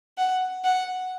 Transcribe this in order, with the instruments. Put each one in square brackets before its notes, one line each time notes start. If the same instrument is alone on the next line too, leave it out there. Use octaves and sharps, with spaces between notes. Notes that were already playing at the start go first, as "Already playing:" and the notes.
[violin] F#5
F#5